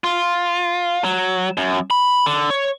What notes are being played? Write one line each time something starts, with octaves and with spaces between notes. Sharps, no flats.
F4
F#3
F#2
B5
D3
C#5